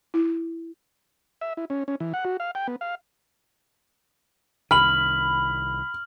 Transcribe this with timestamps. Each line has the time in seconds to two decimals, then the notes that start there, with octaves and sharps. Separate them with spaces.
0.14 E4
1.41 E5
1.57 E4
1.70 C#4
1.88 C#4
2.00 E3
2.14 F#5
2.25 F#4
2.40 F5
2.55 G5
2.68 B3
2.81 F5
4.71 C2 D#3 B5 F6 F#7